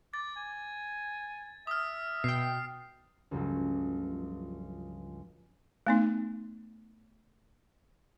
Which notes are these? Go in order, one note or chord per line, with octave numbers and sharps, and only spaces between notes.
D6 A6
G#5
E5 D#6 F6
B2 G5 C7
C#2 G2 F3 F#3 A3
A3 B3 D#4